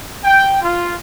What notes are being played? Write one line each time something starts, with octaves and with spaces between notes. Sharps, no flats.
G5
F4